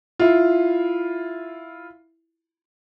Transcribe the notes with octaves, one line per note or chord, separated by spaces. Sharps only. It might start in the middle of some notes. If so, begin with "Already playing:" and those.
E4 F4